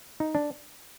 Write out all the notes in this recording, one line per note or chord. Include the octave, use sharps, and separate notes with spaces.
D#4
D4